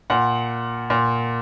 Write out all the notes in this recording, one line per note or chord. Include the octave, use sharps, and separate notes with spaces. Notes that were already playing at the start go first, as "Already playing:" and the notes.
A#2 F#5
A#2